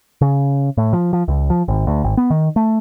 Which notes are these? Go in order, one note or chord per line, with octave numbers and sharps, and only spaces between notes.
C#3
A2
F3
F3
C#2
F3
G#1
D2
G#1
B3
D#3
A3